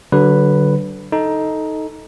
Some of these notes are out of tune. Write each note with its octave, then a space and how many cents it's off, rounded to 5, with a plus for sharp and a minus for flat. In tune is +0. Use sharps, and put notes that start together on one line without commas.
D3 -5 F#3 +40 B4 +0
D#4 +10 A4 +0